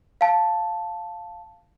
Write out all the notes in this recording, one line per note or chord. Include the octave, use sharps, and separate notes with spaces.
F5 A5